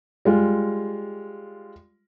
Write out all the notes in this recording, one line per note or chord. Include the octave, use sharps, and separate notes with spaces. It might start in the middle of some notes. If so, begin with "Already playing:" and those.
G3 G#3 F4